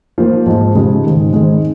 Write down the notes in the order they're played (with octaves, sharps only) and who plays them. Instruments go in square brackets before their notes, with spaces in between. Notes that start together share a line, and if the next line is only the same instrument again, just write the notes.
[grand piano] F3 A#3 F4 C5
G#2 F3 G#3
C#3 F3 G#3 D#4 G4
G#2 D#3 G#3
D#3 G#3 C4 D#4 G#4